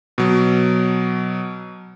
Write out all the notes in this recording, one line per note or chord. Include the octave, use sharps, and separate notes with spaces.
B2 F#3